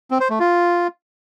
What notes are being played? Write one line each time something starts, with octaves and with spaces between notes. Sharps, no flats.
C4
C5
A3
F4